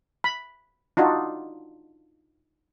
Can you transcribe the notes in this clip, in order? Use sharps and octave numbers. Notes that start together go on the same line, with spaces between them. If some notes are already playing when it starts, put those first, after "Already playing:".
B5
D4 D#4 F4 F#4